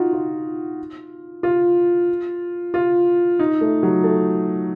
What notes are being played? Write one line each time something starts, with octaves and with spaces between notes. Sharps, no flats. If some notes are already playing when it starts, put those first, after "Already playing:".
Already playing: D#4 F4 F#4
F4
F4
F4
D#4
A3
F#3
A3